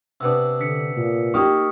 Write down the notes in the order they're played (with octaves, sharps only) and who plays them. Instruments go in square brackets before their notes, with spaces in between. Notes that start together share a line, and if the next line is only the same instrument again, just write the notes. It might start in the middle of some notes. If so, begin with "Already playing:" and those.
[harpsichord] C3 B3 D4 [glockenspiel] E6
[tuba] D3 [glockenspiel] E6 B6 C#7
[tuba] A#2
[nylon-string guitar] A#3 D#4 G4 [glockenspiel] C#6 D#6 F6